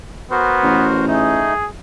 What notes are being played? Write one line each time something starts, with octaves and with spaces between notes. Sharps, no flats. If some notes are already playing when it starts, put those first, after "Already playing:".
B3 F#4 A#4 C5
A1
A3 D#4 G#4